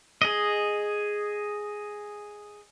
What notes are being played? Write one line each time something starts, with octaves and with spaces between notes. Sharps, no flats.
G#4 D#5